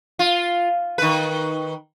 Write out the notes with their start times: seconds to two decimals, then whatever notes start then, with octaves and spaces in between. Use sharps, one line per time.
0.19 F4
0.98 D#3 B4